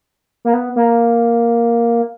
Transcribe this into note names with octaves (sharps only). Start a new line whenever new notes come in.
A#3
B3
A#3